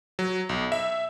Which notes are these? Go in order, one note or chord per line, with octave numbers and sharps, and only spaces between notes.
F#3
B1
E5